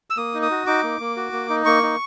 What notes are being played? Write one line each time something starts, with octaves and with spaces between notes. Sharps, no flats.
E6
A#3 D#6
D#4
D#6
F#4
D#4 D6
A#3
A#3
F#4
A#3
D#4
A#3 C#6
D#4